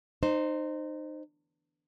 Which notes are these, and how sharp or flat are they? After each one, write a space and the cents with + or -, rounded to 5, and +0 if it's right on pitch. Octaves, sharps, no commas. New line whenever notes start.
D#4 -25 C5 +0